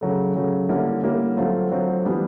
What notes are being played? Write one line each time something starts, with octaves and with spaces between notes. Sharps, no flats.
C#3 F#3 A3
C#3 F#3 A3
D3 G3 A#3 C#4 E4
D3 G3 A#3 C#4 E4
D3 F#3 A3 C4 F4
D3 F#3 A3 C4 F4
E3 G3 B3 D4